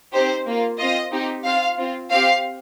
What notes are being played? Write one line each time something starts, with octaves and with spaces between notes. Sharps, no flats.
C4 D#4 G4 C5
A#3 F4
C4 F4 D#5
C4 D#4 G4
C4 F4 F5
C4 F4
C4 G4 F5